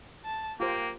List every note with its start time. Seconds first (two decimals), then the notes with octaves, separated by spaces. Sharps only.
0.25 A5
0.60 A#3 F4 G4 C5 G5